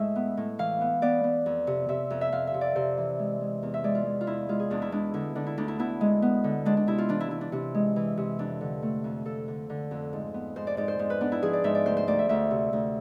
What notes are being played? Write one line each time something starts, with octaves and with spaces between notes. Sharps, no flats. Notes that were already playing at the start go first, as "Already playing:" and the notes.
Already playing: A2 G#3 E5
B3
A2
E3 F5
B3
B3 D5
B3
F2
C3
C3 E5
F2
E5
F2 F5
E5
C3
D5
C3 C5
E3
G#3
G#3
E2
E5
G#3 D5
F4
G#3
F4
E2 E4
G#3 F4
G#4
E2 D4
E4
G#3 D4
D3 E4
D3 D4
E4
D2 D4
E4
B3 E4
G#3
B3
D3
G#3 D4
D4
C3 E4
F4
E3 D4
E4
E3 E4
D4
C3 D4
G#3
E3
C3
F2 D4
D3
A3
F2
F2 A4
D3
D3
F2
G#2
B3
G#2 C5
D5
G#2 D5
C5
G#2
B4
B3 D4
E4
F3 G#4
D5
G#2 E5
D5
D2 C5
C5
D2 D5
E5
D2 E5
C3
D2